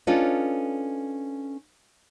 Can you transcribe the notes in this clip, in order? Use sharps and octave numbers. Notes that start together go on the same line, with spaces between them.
C#4 D4 F4 A4 B4 D#5